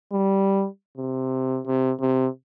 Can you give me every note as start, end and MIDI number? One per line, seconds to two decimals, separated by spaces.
0.12 0.66 55
0.98 1.60 48
1.67 1.92 48
2.01 2.27 48